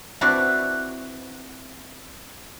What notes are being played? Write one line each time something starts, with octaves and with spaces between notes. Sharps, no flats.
C4 D4 E4 F#4 B4 C5